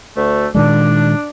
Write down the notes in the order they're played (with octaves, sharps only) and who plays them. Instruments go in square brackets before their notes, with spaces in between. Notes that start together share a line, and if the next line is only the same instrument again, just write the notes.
[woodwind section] D2 A3
[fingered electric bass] A#2 D#3 G#3 [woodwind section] D4